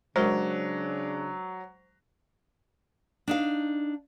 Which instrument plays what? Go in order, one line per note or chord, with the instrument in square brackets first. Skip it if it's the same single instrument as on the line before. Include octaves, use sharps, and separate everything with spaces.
[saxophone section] C#3 D4 [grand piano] F#3 [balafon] G#3 A#4 [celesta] C5
[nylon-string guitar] D4 D#4 F5